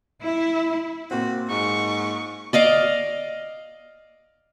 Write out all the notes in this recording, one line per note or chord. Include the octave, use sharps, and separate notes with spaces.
E4
A#2 C4 F#4
G#2 C#6
D5 D#5 F5 D6